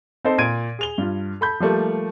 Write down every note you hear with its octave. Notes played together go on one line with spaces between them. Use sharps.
C4 D#4 A4 C5
A#2 G#6 D7 D#7
G#4 F7 G7
G2 F4
A4 B5 G6
F3 G3 A3 A#3